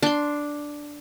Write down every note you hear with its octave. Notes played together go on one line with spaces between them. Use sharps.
D4 C6